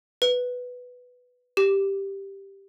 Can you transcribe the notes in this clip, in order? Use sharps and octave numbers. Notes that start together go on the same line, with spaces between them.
B4
G4